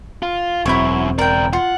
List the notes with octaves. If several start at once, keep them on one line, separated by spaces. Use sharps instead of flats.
F4
E1 F#2 C4 E4 C#5
C#2 A#4 D5 G5
F4 F#5